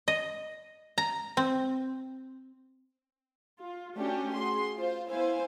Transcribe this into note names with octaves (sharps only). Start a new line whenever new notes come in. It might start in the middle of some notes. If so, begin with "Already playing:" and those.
D#5
A#5
C4
F4
A3 C#4 D4 F#4 G4
F#4 G#4 C6
F4 C5
B3 E4 C5 F5 G#5